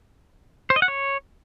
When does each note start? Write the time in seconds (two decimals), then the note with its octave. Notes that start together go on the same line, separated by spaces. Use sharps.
0.70 C5
0.76 D#5
0.82 F#5
0.88 C#5